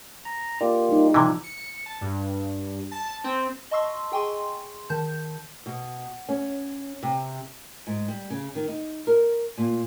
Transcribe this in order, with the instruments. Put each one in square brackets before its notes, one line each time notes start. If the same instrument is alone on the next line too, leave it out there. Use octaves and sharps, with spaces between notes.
[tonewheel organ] A#5
[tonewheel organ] A#3 F4 G4 [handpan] D5
[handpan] G3 D#4
[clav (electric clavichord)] C3 E3 [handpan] F3
[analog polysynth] C#7
A5
G2
A5
C4
[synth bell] D#5 A5 C6 C#6 E6 C7
G#4 G5 G#5 C6 C#6
D#3 A5 G6
[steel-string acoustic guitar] B2
C#4
C3
[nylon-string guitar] G#2
G3
C#3
D#3
D#4
A#4
A#2